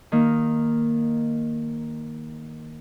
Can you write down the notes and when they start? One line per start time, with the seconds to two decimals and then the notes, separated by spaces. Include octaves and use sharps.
0.12 D#3 A#3